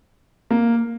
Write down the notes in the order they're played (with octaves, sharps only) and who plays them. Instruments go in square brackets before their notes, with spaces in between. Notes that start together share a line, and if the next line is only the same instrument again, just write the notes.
[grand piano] A#3